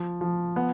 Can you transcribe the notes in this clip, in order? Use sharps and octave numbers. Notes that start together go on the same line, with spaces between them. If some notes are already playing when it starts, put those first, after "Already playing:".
Already playing: F3
F3
B3